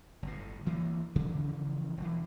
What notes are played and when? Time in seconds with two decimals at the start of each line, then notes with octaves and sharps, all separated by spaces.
0.23 G1 A2
0.66 D2 E3 A#3
1.16 C#3 E3 F3 C#4
1.98 E1 E3